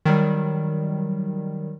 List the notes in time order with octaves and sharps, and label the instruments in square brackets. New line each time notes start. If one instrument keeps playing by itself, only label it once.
[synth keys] D#3 F#3 G3